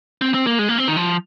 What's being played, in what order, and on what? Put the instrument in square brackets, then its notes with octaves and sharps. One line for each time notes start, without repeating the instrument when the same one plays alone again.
[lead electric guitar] C4
C4
A#3
G#3
A#3
C4
D#3
F3